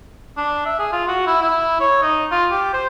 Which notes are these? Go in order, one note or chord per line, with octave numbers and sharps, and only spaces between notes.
D4
E5
G#4
F4
F#4
E4
E4
C#5
D#4
F4
G4
C5